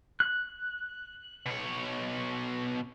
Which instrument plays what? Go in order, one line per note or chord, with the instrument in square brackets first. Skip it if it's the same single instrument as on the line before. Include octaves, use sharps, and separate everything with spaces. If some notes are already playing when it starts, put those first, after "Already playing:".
[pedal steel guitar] F#6
[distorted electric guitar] B2 C#5